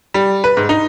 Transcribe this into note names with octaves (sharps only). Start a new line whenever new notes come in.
G3
B4
G#2
D#4